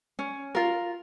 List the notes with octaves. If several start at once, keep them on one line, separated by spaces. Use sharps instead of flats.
C#4
F4 A#4